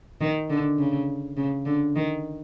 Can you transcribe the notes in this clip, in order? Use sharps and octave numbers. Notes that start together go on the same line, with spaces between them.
D#3
D3
C#3
C#3
D3
D#3